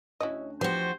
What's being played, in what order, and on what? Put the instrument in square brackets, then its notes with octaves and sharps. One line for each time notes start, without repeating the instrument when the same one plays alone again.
[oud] D2 C#4 F#4 [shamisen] E4 D#5
[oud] E2 G4 [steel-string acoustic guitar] F3 F#4 [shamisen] B3 [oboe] C5